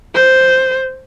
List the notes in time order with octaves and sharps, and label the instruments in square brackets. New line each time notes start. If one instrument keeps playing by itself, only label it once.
[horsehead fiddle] C5